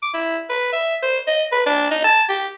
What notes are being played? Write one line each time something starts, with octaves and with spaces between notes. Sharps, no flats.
D6
E4
B4
E5
C5
D#5
B4
D4
D#4
A5
G4